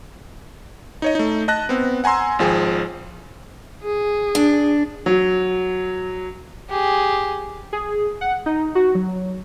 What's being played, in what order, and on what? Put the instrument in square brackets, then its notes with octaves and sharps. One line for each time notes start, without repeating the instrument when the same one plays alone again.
[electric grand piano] D#4 C#5 D#5
A3 D#4
D#5 A5 F#6 A#6
B3 C4
F#5 G#5 A#5 C6 E6
G#1 F3 G#4 G5
[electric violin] G#4
[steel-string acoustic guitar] D4
[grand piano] F#3
[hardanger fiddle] G4 G#4
[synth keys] G#4
F#5
D#4
F#4
F#3